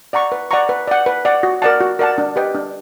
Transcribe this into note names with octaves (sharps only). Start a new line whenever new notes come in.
D5 F#5 A#5 C#6
B4
D5 F#5 A#5 C#6
B4
D5 F#5
B4
D5 F#5
F#4
A#4 D5 F#5 A5
F#4
A#4 D5 F#5 A5
D4
G4 B4 D#5 G5
D4